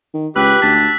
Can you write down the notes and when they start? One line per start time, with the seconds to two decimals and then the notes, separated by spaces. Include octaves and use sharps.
0.14 D#3
0.36 C#2 G4 B4 E6 F#6 B6
0.62 D2 A5 B6